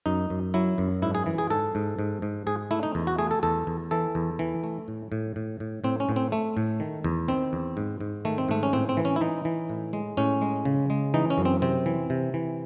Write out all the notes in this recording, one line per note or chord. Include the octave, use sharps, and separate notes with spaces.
F#2 D#4
F#2
F#3 E4
F#2
G#2 E4
G#4
E3
G#4
G#2 A4
G#2
G#2
G#2
G#2 G#4
A3 E4
D#4
E2
F#4
A3 G#4
A4
E2 A4
E2
E3 A4
E2
E3
A3
A2
A2
A2
A2
A2 C4
C#4
A2
C4
A3
A2
D#3
E2
D#3 C4
E2
G#2
G#2
D#3 A3
C4
G#2 A3
C#4
A2 C4
C4
E3
C#4
E4
E3 D#4
E3
A2
G#3
A2 C#4
G#3
C#3
G#3
E3 D#4
C#4
F#2
C4
C3 C4
E3
C3
E3